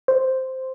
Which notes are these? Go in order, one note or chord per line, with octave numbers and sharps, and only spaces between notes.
C5